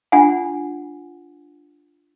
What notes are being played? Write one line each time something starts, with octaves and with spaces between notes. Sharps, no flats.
D4 F4 F#5 G#5